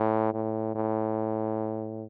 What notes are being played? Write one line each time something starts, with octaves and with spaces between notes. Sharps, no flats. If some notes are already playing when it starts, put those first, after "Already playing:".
Already playing: A2
A2
A2